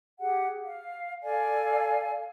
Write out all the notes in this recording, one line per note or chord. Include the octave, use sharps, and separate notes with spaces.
G4 G#4 F#5
F5
A4 D5 F5 G#5